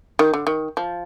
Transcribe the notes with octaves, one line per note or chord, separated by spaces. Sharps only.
D#3
D3
D#3
F3